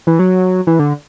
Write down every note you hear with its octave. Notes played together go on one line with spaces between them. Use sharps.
E3
F#3
E3
D3